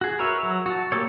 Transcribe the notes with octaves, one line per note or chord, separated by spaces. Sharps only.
F#4 G#4
A#4 B4 C#5 E5
F#3
F#4 A5
A3 A#3 G4 A4 C#5